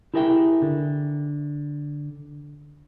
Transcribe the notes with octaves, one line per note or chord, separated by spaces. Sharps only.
E4 G4 G#4 A#4 E5 G5
D3